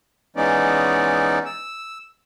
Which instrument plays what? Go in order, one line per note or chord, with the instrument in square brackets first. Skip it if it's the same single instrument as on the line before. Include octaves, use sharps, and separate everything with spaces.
[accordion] E3 G#3 B3 C#4 D#4 D5
E6